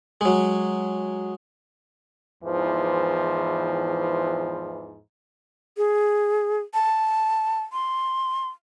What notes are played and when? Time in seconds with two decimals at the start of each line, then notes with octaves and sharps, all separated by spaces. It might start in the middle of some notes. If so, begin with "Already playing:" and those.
0.21 F#3 G#3
2.44 E2 G#2 E3 F3
5.77 G#4
6.74 A5
7.73 C6